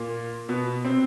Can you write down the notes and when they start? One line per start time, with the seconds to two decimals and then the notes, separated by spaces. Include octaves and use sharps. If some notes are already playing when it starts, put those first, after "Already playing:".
Already playing: A#2 A#3
0.49 B2 B3
0.85 C3 C4